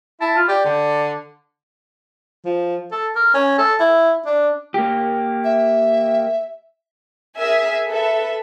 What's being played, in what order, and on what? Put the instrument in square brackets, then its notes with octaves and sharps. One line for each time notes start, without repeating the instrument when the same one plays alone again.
[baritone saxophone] E4 [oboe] A5
[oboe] F4
[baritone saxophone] G4 [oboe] D5
[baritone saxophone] D3
[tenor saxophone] F3
A4
A#4
C#4
A4
E4
D4
[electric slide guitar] A#3 G4
[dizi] E5
[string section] G#4 A#4 E5 G#5
A4 B4 E5